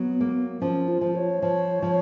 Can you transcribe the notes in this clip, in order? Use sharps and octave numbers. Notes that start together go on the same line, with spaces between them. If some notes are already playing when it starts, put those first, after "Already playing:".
Already playing: F#3 B3
A#3
F3 C#4
F4
F3
C#5
F3
F3